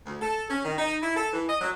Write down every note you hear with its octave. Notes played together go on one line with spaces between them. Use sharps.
D2
A4
C#4
D#3
D#4
E4
A4
E3
D#5
F#3